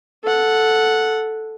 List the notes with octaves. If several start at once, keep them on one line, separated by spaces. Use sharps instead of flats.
A4 F#5